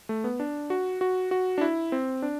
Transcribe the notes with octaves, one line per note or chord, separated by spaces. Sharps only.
A3
B3
D4
F#4
F#4
F#4
D4
E4
C4
D4